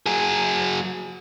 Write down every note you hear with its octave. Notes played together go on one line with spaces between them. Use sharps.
F#3 G#4